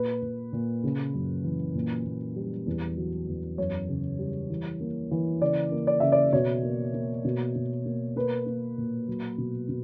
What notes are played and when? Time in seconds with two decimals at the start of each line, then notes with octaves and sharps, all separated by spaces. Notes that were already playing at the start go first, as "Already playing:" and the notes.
Already playing: A#2 B4
0.22 A#2
0.53 A#2
0.84 C#3
1.14 F#2
1.44 E3
1.75 A#2
2.06 A#2
2.36 G3
2.66 E2
2.97 F#3
3.28 E2
3.58 F#2 C#5
3.89 C#3
4.19 G3
4.50 E3
4.81 A#3
5.11 E3
5.41 C#3 D5
5.72 A#3
5.87 D5
6.00 C#3 E5
6.12 D5
6.33 B2 C#5
6.63 A#3
6.94 A#3
7.25 B2
7.55 B2
7.85 A#3
8.16 A#3 B4
8.46 A#3
8.78 A#2
9.08 F#3
9.38 B2
9.69 B2